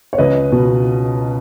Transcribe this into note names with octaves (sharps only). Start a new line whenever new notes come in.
C#5
C#2 B4 D#5
B2